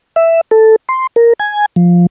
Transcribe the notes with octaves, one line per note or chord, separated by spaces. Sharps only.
E5
A4
C6
A#4
G#5
F3